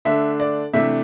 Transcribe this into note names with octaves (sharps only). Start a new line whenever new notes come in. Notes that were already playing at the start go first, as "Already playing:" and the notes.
D3 A3 D4 E5
D5
C3 E3 A3 D4 E5